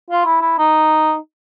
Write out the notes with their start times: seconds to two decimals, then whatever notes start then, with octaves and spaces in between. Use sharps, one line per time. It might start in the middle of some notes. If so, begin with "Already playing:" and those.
0.10 F4
0.25 E4
0.41 E4
0.58 D#4